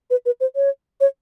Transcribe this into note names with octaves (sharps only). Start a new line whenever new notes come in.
B4
B4
C5
C#5
C#5